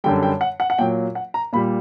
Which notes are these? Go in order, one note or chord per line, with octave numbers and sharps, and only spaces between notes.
F#2 D3 G3 G5
G5
F#5
F#5
F#5
A#2 F#3 G5
F#5
A#5
A#2 G3 B5